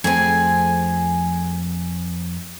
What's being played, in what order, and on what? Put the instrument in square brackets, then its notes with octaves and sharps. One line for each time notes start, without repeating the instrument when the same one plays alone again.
[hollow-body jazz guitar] F2 A3 C4 [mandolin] G#4 G#5